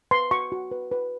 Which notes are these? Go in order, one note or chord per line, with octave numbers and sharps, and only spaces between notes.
B4 C6
F#4 C#6
F#4
B4
B4